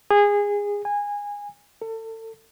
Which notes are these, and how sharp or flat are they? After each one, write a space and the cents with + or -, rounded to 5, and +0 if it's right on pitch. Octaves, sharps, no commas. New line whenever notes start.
G#4 -20
G#5 -20
A4 +30